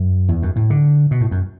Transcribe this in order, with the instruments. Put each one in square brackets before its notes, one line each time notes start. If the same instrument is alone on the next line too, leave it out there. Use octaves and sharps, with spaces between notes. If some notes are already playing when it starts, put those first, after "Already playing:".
Already playing: [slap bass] F#2
E2
F#2
A2
D3
B2
A2
F#2